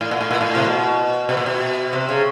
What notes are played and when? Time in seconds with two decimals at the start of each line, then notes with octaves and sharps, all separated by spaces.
0.01 A2
0.11 A#2
0.21 A2
0.31 A#2
0.41 A2
0.55 C3
0.64 B2
1.29 B2
1.37 A#2
1.46 B2
1.93 C3
2.09 C#3